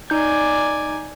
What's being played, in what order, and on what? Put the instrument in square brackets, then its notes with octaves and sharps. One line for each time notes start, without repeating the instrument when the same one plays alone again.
[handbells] D#4 G6 [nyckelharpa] D5 G#5